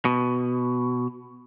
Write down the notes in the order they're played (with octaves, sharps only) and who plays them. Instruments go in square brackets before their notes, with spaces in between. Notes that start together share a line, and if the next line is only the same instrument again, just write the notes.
[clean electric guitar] B2